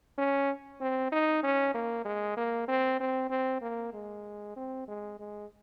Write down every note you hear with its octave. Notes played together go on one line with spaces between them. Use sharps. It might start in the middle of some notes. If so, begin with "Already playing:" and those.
C#4
C4
D#4
C#4
A#3
G#3
A#3
C4
C4
C4
A#3
G#3
C4
G#3
G#3